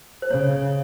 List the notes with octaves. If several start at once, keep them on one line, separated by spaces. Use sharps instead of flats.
C5
C#3 C#5